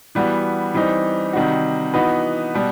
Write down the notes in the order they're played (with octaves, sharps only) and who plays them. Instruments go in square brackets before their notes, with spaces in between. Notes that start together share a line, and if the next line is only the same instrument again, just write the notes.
[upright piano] E3 G3 B3 F#4
E3 G3 C4 D#4
C3 D#3 G3 D#4 F#4
E3 B3 D#4 F#4 B4
B2 G3